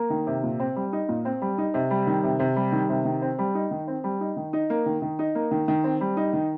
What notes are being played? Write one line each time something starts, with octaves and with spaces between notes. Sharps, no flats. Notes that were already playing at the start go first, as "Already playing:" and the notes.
Already playing: A#3
D#3
C3
A#2
C4
G3
D#4
A#2
C4
G3
D#4
C3
G3
D#3
C3
C3
G3
D#3
C3
D#3
C4
G3
D#4
D#3
C4
G3
D#4
D#3
D#4
A#3
D#3
D#3
D#4
A#3
D#3
D#3
C4
G3
D#4
D#3